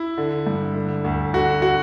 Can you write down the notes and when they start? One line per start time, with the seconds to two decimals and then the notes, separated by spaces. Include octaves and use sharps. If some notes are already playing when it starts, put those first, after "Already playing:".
Already playing: E4
0.18 D3
0.47 G2
0.75 D3
1.05 D2
1.34 D3 F#4
1.62 F#4